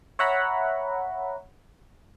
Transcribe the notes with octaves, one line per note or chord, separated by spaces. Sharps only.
C#5 E5 F#5 A#5 B5